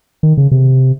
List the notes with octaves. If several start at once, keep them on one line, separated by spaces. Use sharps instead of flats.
D#3
C#3
C3